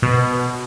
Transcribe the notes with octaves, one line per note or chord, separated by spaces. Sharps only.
B2